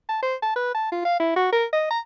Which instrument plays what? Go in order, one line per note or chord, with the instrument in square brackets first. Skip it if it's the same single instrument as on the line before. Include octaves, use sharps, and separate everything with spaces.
[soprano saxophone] A5
C5
A5
B4
A5
F4
F5
E4
F#4
A#4
D#5
A#5